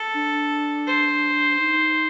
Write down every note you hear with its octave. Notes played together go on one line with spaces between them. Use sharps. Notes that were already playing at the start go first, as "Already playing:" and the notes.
Already playing: A4
D4
C5
D#4